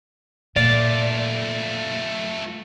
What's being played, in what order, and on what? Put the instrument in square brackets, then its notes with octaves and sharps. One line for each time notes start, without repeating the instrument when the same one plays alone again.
[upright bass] A#2 [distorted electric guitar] A3 F4 [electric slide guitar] D5